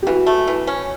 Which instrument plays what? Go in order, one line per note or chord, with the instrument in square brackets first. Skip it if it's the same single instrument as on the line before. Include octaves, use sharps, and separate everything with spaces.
[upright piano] G4
[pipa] E3 [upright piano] F#4
[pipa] A3
E3
C#4